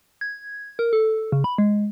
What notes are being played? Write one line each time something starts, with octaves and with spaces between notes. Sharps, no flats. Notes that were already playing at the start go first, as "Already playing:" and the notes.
G#6
A#4
A4
C#3
B5
G#3